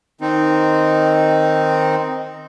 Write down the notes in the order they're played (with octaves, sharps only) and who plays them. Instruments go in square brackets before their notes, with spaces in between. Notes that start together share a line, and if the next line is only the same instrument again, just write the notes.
[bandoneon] D#3 C4 D#4